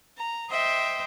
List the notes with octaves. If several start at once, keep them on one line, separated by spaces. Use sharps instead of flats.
A#5
C5 D#5 E5 G5